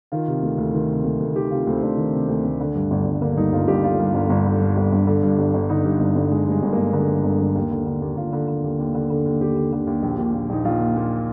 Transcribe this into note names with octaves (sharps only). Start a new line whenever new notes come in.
D#3 F4
C3
D2
D2
D#3
C3
D2
D2
D#3 G4
C3 F4
D2 C4
D2 D4
D#3
C3
D2
D2
D3
G2
G1
G1
D3 A#3
G2 D#4
G1 F4
G1 G4
D3 F4
G2
G1
G1
D3
G2
G1
G1
D3
G2
G1
G1
D3 D#4
G2
G1
G1
D3 G#3
G2 G#3
G1
G1 A#3
D3 A#3
G2
G1
G1
D#2
D3
D3
D#2
D#2 F4
D3
D3
D#2
D#2
D3
D3
D#2
D#2 G4
D3
D3
D#2
A#1
A#2
A#2
A#1 D#4
A#1 F4
A#2
A#2